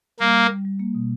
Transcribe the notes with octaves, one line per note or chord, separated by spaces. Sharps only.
G3 A#3
G3
G3
G3
A#3
B2